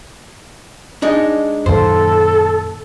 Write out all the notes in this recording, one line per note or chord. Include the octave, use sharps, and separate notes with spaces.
G#3 D4 D#4
F#2 A#2 D#3 A4 C5